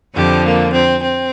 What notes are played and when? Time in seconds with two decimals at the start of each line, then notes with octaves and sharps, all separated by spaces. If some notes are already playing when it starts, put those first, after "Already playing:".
0.15 F2 D3 F3 G4
0.44 A#3
0.73 C4
1.02 C4